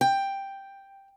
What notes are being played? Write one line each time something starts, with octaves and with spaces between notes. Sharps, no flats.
G5